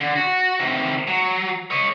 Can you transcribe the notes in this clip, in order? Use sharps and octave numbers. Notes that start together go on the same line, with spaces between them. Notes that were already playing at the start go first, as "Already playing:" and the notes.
D3
F#4
C3 D#3
F#3
C#5 D#5